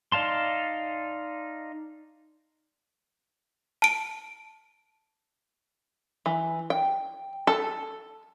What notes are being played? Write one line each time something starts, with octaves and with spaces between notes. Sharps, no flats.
D#4 D5 F5 A5 C6
A5 D7
E3
G5
A4